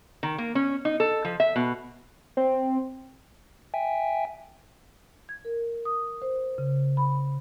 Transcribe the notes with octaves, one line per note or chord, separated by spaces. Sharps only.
D#3
A#3
C#4
D#4
A4
F3
E5
B2
C4
E5 G5 G#5
G#6
A#4
D#6
C5
C#3
B5